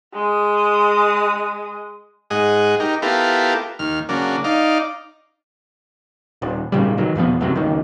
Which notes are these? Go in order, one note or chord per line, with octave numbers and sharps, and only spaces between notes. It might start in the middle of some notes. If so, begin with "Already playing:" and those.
G#3 D#6
G#2 G#4 D#5 F#5
D#4 G4 A#4
B3 E4 F4 G4 A4 A#4
D#2 F6
C#3 F#3 A#3 D4
D#4 D5 F5
D#1
G#1 A#2 C#3 G3
D#3 F#3
E2 B2 F3 B3
C#2 F#2 C3 F#3
C#2 D#3